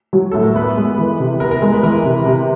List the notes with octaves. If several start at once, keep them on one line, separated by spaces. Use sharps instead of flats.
F#3
A2 A4
A#4
B3 B4
G#3
E3
C3
B3 A#4
A#4
G#3 A#4
B4
E3 A#4
C3
C3